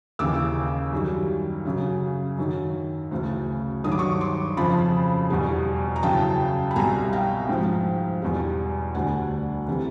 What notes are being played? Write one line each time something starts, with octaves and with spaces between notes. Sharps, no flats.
D#2 C#3 E3 D6 E6
F#2 D#3 G3
F#2 C#3 F#3
F#2 D#3 F#3
D2 C#3 E3
G2 D#3 F#3 D#6
D6
C#6 D#6
C6 D6
F2 C#3 F3 A5 B5
E2 B2 G3
A#5
F#2 C#3 E3 G5 A5
B5
C2 B2 G3 G#5 A#5
F5 G5
G#2 F3
E2 B2 G3
D2 D3 G3 F#5 G#5
C3 E3 G3